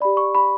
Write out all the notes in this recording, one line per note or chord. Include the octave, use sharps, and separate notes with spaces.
G4 D5 B5
C#6
B5